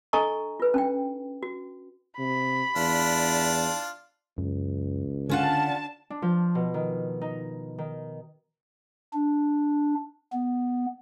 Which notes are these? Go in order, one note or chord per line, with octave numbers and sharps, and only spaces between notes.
D4 A4 D#5 G#5 A#5 C#6
F4 B4
C#4 D4 G5
F#4
C3 B5
E2 D4 F4
C#2 F#2
D3 C#4 D4 F4 F#5 A5
D4
F3
B2
D#3
D#4
D#3
D4
B3